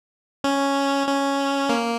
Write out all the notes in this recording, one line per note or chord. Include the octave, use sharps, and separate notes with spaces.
C#4
C#4
A#3